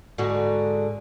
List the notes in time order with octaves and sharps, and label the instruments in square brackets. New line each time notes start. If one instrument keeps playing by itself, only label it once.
[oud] G#2 D3 F#4